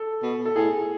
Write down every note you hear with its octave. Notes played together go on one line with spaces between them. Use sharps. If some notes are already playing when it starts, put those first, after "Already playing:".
Already playing: A4
B2
A4
A2 G#4